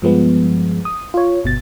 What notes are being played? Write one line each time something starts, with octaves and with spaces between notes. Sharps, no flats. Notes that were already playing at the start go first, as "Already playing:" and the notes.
G2 F3 G#3 B3
D#6
F4 C#5
G1 B2 A6